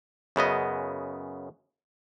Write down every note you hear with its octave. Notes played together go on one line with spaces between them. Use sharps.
F#2 C#3 B3 D#5